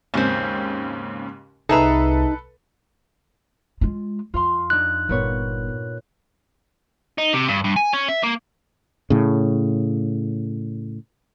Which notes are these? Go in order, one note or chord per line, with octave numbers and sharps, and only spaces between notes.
D#2 G#2 C#3 C4 C#4
C2 D#4 G#4 A4 B4 E5 A#5
G#3 F4
F2 F4 F5 C6
D4 D#4 F#6
G1 A#2 B3 C#5
D#4
C3
G2
G2
G#5
C#4
E5
A#3
A2 C#3